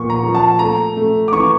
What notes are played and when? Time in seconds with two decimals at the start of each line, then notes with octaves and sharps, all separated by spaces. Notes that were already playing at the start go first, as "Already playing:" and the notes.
Already playing: A#2 F3 C#6
0.10 A#5
0.23 F3
0.35 A5
0.59 A3 A#5
0.97 A3
1.28 D6
1.32 E3 C#6